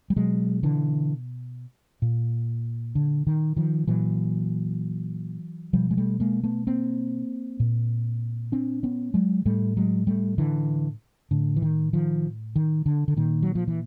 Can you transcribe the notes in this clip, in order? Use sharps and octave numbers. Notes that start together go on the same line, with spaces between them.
G3
B2 F#3 G#3
D3 E3
A#2
D3
D#3
D#3 F3
A#2 E3 F#3
B2 F3 G3
G#3
G3 A3
G#3 A#3
A3 B3
A#3 C4
A#2
C4 D4
B3 C#4
F#3 G#3
A2 G3 A3
F#3 G#3
G3 A3
D3 E3
A2 D3
E3
D#3
D#3 F3
D#3
D3
D3
A#2 D#3
F#3
F3
E3